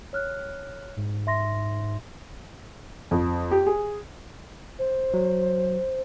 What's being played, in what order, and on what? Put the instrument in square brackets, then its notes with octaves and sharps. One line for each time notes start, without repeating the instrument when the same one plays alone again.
[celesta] C#5 F6 F#6
[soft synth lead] G#2
[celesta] E5 C6 A#6
[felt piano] F2
G4
G#4
[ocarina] C5
[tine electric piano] F#3